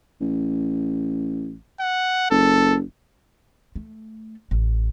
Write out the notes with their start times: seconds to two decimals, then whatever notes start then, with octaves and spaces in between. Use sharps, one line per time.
0.21 A1
1.81 F#5
2.31 F#1 A4
3.76 A3
4.51 A1